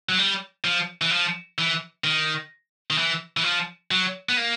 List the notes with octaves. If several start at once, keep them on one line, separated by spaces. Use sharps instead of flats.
F#3
G3
F3
E3
F3
E3
D#3
D#3
E3
E3
F3
F#3
B3
A#3